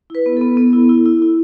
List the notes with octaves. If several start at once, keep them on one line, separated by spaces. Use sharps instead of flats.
E4 B4
B3
B3 A4
B3
E4
E4
E4
E4